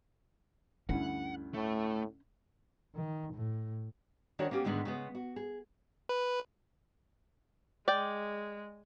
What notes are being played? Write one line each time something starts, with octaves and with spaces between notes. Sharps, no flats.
D2 G2 C#4 E4 F#5
A2 A3
D#3
A2
D#3 C#4 D4 F#4 C5 C#5
A#3 B3 C#4 G4
G#2 D3 D#3 G#3 B3
C#3 G#3 B3
F#4
G#4
B4
G#3 D5 G5